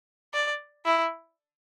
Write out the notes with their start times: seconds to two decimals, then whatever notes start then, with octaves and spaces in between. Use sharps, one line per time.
0.34 D5
0.85 E4